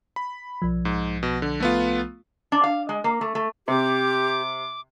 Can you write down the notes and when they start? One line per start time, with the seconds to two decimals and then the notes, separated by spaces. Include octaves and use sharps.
0.16 B5
0.62 B1 F3
0.85 G#2
1.23 B2
1.42 D3
1.60 A3 B3 F4
2.52 D4
2.64 F5
2.89 G#3
3.04 A#3
3.21 A3
3.35 A3
3.68 C3 G4 D6